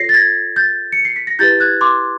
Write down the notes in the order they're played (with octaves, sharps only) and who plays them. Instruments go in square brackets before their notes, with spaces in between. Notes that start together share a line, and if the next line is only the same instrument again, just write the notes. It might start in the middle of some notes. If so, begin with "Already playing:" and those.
Already playing: [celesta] F4 A4 C#5 A#6 C7
A6
G#6 A#6
G6 A6
C#7
C7
B6
A#6
E4 G4 B4 G6 A6
F#6 G#6
C6 D6